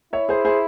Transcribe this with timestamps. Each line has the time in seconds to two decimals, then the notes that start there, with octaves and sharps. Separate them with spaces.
0.13 E4 C#5 E5
0.29 G#4 C5
0.45 G#4 C5